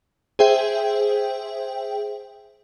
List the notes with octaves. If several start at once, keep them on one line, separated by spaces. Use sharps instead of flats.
G#4 C5 E5 G5